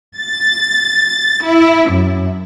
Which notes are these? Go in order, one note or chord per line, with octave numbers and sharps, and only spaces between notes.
A6
E4
F#2